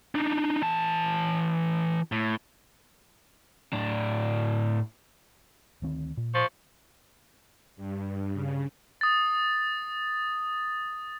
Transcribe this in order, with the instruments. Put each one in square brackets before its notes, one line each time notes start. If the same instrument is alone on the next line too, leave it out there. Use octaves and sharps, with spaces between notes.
[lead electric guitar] D4 D#4
E3 A5
A2
[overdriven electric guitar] A2 D4
[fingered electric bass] D2 D#3 C4
A#2
[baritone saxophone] F3 [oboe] C#6
[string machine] G2
C#3
[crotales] D#6 A6